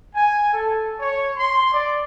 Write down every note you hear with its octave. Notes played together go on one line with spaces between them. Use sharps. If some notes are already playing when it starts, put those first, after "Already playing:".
G#5
A4
C#5
C6
D5